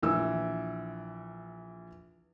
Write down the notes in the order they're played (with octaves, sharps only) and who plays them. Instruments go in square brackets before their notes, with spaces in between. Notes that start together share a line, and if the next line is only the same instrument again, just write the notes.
[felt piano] A#1 E3 E6